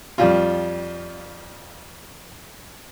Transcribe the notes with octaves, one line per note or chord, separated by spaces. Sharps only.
F2 G3 F4